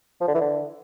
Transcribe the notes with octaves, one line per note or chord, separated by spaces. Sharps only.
F3
D3
E3
D3